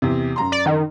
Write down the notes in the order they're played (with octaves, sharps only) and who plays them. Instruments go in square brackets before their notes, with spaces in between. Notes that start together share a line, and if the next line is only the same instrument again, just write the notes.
[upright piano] E2 C3
F#2 A#5 C6
[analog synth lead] D5
D#3